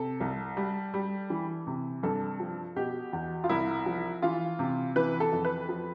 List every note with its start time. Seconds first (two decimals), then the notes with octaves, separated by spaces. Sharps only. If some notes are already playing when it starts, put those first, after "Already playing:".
Already playing: C3 A4
0.21 C2
0.57 G3
0.94 G3
1.30 E3
1.67 C3
2.03 G2 A4
2.40 F3
2.76 B2 G4
3.13 E2
3.44 F4
3.49 C2 E4
3.86 F3
4.22 E3 F4
4.59 C3
4.96 E3 B4
5.20 A4
5.32 F2
5.45 B4
5.69 F3